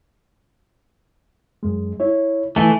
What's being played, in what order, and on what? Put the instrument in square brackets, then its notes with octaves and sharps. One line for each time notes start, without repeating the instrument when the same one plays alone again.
[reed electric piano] F#2 G#3
E4 C#5
[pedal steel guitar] E3 A3 [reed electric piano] G#5